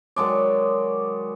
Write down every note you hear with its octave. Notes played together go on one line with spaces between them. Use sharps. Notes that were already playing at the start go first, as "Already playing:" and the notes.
D#3 F#3 G#3 D5